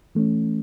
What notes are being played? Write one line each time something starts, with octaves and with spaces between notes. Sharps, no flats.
E3 A3 C#4